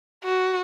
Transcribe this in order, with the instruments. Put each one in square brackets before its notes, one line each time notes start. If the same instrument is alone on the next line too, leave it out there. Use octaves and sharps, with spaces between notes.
[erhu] F#4